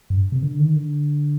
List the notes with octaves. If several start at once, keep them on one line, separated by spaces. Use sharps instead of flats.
G2
C3
D3
D#3
D3